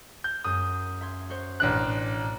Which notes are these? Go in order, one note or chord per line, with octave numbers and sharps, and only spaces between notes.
G6
F#2 G#3 D#6 G6
E5 C6 G#6
F#4 C5 C#5
A1 G#2 B2 D4 F#6